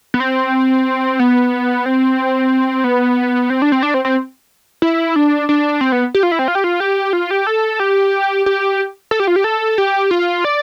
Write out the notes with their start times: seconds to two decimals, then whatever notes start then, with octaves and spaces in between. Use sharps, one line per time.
0.14 B3
0.20 C4
1.19 B3
1.86 C4
2.84 B3
3.50 C4
3.62 D4
3.72 C4
3.83 D4
3.94 C4
4.05 C4
4.82 E4
5.16 D4
5.49 D4
5.81 C4
5.92 B3
6.14 G4
6.23 F4
6.32 E4
6.39 C4
6.48 F4
6.55 G4
6.64 F4
6.80 G4
7.13 F4
7.31 G4
7.47 A4
7.80 G4
8.46 G4
9.11 A4
9.20 G4
9.27 F4
9.36 G4
9.44 A4
9.78 G4
10.11 F4
10.44 D5